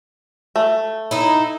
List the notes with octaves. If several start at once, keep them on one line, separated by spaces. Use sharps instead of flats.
A3
D#4 E4